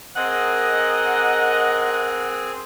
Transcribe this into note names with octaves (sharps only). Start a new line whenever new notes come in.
C4 G#4 A#4 D#5 F#5